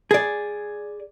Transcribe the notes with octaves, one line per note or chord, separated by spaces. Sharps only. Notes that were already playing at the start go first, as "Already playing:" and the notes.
G#4 D5